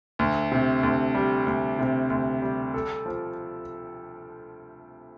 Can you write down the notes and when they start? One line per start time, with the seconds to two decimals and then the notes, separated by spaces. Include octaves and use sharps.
0.19 D2
0.52 C3
0.83 D2
1.15 G3
1.47 D2
1.79 C3
2.10 D2
2.42 G3
2.74 A4
3.06 F3